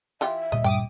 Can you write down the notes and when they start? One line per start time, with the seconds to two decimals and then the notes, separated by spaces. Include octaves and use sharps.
0.21 E3 F4 G4 E5
0.52 D2 A#2 G3 D#5
0.64 G2 G5 D6 D#6